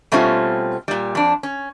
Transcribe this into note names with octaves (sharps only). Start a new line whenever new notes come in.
B2 G3 A3 C4 C#4 F4
A#2 G3
F2 D4
C#4